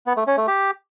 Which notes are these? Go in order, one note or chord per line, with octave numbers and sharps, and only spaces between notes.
B3
A3
C#4
A3
G4